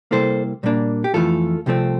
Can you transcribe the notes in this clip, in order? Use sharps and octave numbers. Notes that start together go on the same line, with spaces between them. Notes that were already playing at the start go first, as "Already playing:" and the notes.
C3 G3 A#3 E4 A4 C5
A#2 G3 A#3 D4
G4
F2 E3 A3 F4 A4
C2 C3 F3 A3 C4